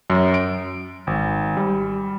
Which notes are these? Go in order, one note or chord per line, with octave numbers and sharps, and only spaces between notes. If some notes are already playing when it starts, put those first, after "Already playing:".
F#2
D7
G#1
G3